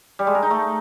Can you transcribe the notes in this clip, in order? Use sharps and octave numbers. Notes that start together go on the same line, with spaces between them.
G3
G#3
A#4
D#4
A3